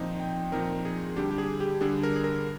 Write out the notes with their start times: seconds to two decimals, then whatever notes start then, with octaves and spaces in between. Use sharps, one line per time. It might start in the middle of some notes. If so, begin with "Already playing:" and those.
Already playing: A#2 F3 C4 D#4
0.20 G5
0.52 A#2 F3 C4 D#4 A#4
0.85 G#4
1.16 D3 G3 D4 G4
1.31 G4
1.38 G#4
1.60 G4
1.81 D3 G3 D4 G#4
2.03 A#4
2.16 G#4
2.24 A#4